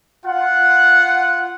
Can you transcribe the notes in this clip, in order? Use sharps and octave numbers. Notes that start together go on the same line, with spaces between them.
F4 F#5